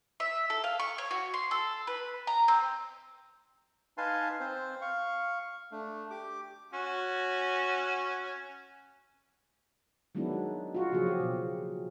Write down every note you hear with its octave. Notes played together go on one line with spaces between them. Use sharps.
E5
A4
F5
C#6
C#5
F#4
C6
A4
B4
A#5
C4
D#4 B4 F5 G#5 A5 C6
C4 C5
F5 C#6
A3 D4
G4 D6
C#4 F#4
D#3 F#3 G#3 B3 D4 E4
F4 F#4
C#3 F3 F#3 A#3 G#4
G4
B2